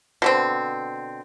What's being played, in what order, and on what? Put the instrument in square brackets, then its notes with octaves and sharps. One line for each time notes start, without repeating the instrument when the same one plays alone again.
[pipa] B2 D3 C4